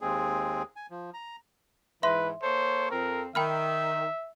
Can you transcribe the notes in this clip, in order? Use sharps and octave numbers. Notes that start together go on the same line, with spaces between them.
D#2 G#3 C4 G#4
G#5
F3
A#5
G#2 E3 B4 E5 C6
A#3 A4 C5 C#5
F2 C4 A#4
D#3 E5 G5 B5 F6